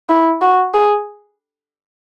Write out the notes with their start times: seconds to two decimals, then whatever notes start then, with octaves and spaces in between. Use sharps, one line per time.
0.09 E4
0.42 F#4
0.74 G#4